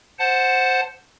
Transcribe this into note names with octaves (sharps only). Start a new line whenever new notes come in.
C5 F#5 A5